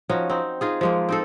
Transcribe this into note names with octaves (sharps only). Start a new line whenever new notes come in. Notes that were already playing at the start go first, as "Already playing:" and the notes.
F3 C#4 D#4 F#4
C4 D#4
D#4 F4 G#4
F3 G#3 A#3
C4 D#4 A4